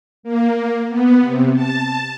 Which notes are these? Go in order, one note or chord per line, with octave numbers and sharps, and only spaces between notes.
A#3
B3
C3
A5